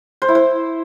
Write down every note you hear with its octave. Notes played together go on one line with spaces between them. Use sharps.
C5
E4
C5